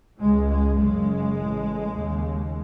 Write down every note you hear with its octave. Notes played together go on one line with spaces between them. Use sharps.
C#2 C#3 G#3
G#3
F#1 F#2 C#3 G#3
A1 A2
D#2 C#3